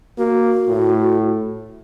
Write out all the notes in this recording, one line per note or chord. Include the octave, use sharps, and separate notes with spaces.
A#3 F#4
A2